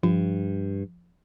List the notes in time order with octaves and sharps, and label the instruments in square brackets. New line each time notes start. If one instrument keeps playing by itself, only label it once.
[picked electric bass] G2 [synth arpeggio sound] F3